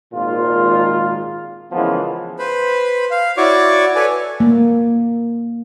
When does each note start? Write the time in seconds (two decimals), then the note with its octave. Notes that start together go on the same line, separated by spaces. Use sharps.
0.13 G#1 A#2 F4
1.72 C#3 E3 F3 G#3 A#3 B3
2.39 B4 C5 B5
3.11 F5
3.37 E4 F#4 C#5 D5 C#6 D6
3.95 A4 B4 C#5 D5 G#5
4.40 A#3